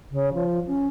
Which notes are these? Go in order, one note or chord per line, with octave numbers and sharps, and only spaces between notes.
C#3
F3
C#4